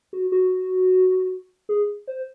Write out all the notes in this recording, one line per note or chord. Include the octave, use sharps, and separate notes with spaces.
F#4
F#4
G#4
C5